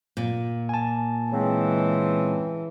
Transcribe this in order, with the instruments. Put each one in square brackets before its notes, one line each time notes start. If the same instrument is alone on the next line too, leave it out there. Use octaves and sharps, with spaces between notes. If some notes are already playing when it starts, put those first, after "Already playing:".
[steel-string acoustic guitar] A#2
[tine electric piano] G#5 A5
[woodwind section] C#3 G#3 C4 [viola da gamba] E3